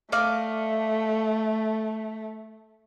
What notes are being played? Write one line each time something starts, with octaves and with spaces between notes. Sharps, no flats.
A3 D5 D#5 F5